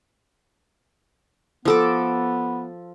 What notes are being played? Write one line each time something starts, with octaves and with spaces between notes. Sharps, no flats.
F3 B3 A4 D6